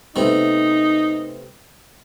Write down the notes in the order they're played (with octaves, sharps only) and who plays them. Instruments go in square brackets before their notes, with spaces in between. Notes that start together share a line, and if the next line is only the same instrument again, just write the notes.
[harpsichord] C3 A3 B3 [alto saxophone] D#4